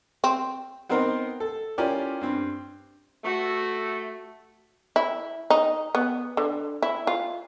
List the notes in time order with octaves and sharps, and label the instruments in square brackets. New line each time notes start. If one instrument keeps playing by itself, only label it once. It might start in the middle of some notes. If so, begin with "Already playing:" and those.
[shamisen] C4
[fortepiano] B3 C4 D#4 A#4 C5
A4
C#4 E4 F4 G4 A#4 D5
G2 C4
[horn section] A3 [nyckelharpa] F#4
[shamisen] E4
D#4
B3
D3
E4
F4